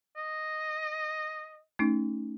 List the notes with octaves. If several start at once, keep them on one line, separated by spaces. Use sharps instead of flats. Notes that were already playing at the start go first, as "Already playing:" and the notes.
D#5
A3 C#4 D#4